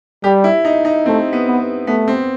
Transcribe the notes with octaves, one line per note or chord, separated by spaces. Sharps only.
G3 G4
E4
D#4
D#4
A3 C4
B3
B3
A3 B3
C4